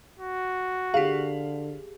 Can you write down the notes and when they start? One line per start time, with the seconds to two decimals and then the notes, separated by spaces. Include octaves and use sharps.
0.19 F#4
0.94 D3 G4 G#4 F5